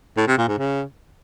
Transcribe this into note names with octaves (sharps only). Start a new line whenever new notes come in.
A2
C3
A#2
G#2
C#3